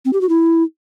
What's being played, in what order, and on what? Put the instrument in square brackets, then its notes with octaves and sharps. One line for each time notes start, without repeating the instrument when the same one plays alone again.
[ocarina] C4
G4
F#4
E4